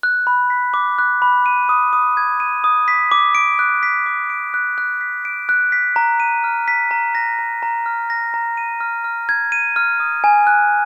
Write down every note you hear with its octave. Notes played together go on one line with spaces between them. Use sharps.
F#6
B5
B6
D6
F#6
B5
D#7
D#6
D#6
G#6
D#7
D#6
B6
D6
D7
F#6
B6
D6
D7
F#6
F#6
B6
D7
F#6
B6
A#5
D#7
F6
B6
A#5
A#6
A#5
A#5
F6
A#6
A#5
D#7
F6
F6
G#6
D#7
F6
D#6
G#5
F#6